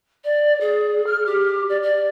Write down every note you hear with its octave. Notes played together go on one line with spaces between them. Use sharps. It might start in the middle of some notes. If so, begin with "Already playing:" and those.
D5
G#4
F6
G4
D5
D5